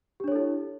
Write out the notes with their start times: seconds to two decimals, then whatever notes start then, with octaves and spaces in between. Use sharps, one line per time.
0.20 G4
0.24 D4
0.28 C#5
0.32 A4
0.36 E4